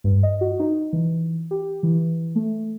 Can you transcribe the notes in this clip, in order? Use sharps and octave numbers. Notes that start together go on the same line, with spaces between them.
G2
D#5
F#4
D#4
E3
G4
E3
A3